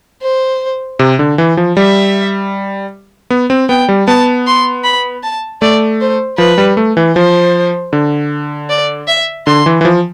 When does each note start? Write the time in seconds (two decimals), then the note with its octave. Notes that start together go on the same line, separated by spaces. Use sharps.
0.22 C5
0.99 C3
1.19 D3
1.38 E3
1.57 F3
1.77 G3 E5
3.30 B3
3.50 C4
3.69 B3 G5
3.89 G3
4.07 B3 A5
4.47 C6
4.84 B5
5.23 A5
5.61 A3 D5
6.01 C5
6.38 F3 B4
6.58 G3
6.77 A3
6.97 E3
7.16 F3 C5
7.93 D3
8.69 D5
9.07 E5
9.47 D3 C6
9.66 E3
9.81 E3
9.85 F3